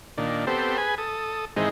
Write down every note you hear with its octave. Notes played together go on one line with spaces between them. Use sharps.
A#2 D#3 D4
B3 C4 G4 A4 C5
G#4 B4 G#5
A4 D#6
G#2 D#3 E3 G#3 C4 D#4